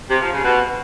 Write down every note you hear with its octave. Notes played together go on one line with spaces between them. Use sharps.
C3
F3
C#3
B2